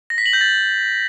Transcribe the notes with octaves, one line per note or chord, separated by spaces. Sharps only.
A#6
B6
F#7
G6
A6